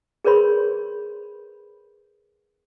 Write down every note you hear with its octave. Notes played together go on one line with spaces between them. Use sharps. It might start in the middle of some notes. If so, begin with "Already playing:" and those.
G#4 A#4 B4 C#5 B5 C6